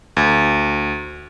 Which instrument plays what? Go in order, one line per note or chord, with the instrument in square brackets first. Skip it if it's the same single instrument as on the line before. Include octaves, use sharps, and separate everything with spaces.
[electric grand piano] D2